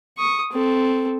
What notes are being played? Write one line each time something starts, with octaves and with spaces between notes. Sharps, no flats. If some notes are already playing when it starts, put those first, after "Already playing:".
C#6 D#6
C4 A4